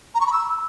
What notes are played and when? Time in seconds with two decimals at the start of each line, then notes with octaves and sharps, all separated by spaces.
0.15 A#5
0.21 C#6
0.27 B5
0.32 E6